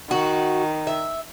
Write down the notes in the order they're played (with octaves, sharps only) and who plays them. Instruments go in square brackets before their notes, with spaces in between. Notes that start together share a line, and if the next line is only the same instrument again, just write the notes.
[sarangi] D#3 [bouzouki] F#4
[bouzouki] E5